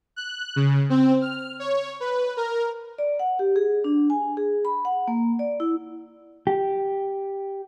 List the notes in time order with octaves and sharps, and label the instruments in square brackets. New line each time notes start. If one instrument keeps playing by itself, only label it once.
[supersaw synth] F#6
C#3
C4
F6
C#5
B4
A#4
[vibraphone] D5
F#5
G4
G#4
D4
G#5
G#4
B5
F#5
A#3
D5
E4
[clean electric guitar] G4